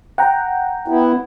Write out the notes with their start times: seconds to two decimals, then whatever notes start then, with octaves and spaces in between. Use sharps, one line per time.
0.18 F#5 G5 A#5
0.88 B3 E4